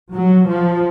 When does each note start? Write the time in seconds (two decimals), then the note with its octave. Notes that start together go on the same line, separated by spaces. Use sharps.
0.13 F#3
0.47 F3